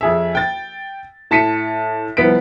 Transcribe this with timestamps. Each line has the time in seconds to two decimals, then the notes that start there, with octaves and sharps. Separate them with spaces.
0.01 F2 G#4 E5
0.35 G5 A6
1.31 A2 A5 B6 C#7 D#7
2.17 C2 F3 B3 B6 D7